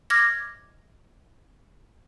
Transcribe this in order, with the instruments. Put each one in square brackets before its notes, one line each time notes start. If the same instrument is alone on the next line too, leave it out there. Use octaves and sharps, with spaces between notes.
[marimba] D6 F6 G#6 A#6